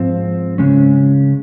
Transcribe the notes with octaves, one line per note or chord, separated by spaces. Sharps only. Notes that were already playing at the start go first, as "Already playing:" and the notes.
Already playing: G#2 F3 C4
C#3 G#3 C#4